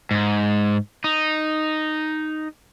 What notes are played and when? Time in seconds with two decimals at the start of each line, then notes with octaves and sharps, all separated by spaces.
0.11 G#2
1.04 D#4